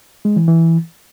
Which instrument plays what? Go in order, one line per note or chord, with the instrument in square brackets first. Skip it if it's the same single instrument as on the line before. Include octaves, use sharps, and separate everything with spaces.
[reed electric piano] G#3
E3
E3